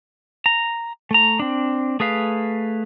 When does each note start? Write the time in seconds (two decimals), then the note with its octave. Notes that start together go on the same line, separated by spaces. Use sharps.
0.46 A#5
1.11 A3 A#5
1.40 C4 D4
2.00 A3 G#4 B4 F5